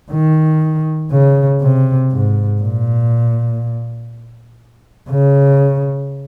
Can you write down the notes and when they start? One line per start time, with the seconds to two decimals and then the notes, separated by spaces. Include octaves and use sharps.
0.11 D#3
1.12 C#3
1.62 C3
2.12 G#2
2.61 A#2
5.11 C#3